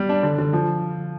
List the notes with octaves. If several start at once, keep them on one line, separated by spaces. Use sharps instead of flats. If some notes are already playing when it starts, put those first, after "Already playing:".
Already playing: G3
D4
D3
D3
F3